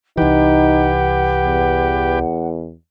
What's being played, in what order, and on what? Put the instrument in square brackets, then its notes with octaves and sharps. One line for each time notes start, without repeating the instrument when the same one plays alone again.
[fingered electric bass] C2 E3 [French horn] D#4 [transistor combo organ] G4 B4 G5 [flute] F#5
[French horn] E2